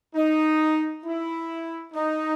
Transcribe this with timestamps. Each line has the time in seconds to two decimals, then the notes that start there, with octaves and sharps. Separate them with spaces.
0.15 D#4
1.04 E4
1.94 D#4